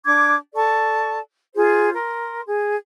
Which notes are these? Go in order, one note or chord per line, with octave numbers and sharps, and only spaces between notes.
D4 D6 G#6
A4 D5 A5 C#6
F4 G#4 C5
A#4 C6
G#4